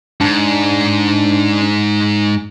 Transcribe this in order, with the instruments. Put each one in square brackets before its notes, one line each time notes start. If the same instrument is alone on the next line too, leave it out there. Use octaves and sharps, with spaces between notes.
[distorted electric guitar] G#2 [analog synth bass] D4